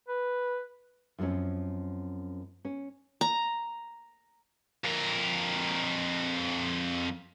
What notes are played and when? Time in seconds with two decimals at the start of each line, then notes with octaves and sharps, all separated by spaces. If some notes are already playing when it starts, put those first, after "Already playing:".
0.08 B4
1.18 F#2 F3 G#3 C4 C#4
2.65 C#4
3.21 A#5
4.85 F2 A#4